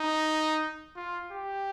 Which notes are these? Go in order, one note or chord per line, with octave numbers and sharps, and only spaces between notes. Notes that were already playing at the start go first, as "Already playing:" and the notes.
Already playing: D#4
F4
G4